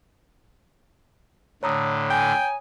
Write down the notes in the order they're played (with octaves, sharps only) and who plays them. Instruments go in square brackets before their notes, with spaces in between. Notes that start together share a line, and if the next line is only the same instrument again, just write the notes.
[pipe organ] A2 D3 [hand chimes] C#5 A#5 D#6
[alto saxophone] G5 [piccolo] G#5